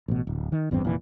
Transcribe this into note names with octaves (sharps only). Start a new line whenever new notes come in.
A1 B2
D1
D#3
G#1 E2 G2 C4
F1 A#2 E3